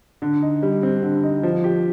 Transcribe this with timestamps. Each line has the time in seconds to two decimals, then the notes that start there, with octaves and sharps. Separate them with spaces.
0.22 D3
0.42 D#4
0.63 G3
0.83 C4
1.03 D3
1.23 D#4
1.43 F3
1.64 G4